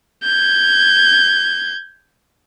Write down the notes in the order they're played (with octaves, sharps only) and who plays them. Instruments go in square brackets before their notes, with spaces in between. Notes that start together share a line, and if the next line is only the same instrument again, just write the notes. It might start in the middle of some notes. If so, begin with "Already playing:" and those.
[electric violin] G6 G#6